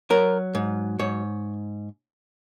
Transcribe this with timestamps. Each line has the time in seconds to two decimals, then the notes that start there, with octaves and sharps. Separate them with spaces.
0.10 F#3 A#4
0.55 G#2
0.99 G#2 C#5